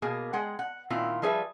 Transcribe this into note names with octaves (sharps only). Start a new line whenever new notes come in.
B2 A#3 G#4
G#3 F#5 G5
F#5
A#2 D#3 C4 E4 F4
F3 G3 G#4 B4 D5 E5